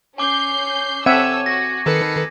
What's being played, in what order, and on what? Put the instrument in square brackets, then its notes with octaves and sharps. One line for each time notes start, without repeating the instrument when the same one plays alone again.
[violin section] C#4 G6 C7 [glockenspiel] G#5 D6
[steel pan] C4 E5 F#5 [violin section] A4 C#5 E6 [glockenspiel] G#6 D#7
[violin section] F#4 [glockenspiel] A#6
[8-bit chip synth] D#3 A4 B4 [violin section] C7 C#7